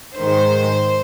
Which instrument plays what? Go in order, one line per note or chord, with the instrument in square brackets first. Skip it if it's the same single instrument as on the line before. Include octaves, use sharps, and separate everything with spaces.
[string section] G#2 D#3 G#3 C5